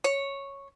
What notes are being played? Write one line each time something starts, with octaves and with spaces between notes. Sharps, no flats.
C#5